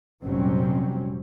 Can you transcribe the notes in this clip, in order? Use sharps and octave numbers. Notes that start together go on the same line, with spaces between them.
F1 A#2 F#3 G3 C4 C#4